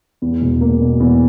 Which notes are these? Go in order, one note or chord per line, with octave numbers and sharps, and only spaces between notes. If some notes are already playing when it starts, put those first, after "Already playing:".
E2
E1
A#3
B2
E2